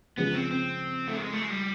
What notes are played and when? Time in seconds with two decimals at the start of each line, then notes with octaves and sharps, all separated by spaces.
0.18 C#3 F3 G#3 B3 C#4
0.35 C4
0.51 C4
1.08 A3
1.17 G#3
1.33 A3
1.43 G#3
1.50 G3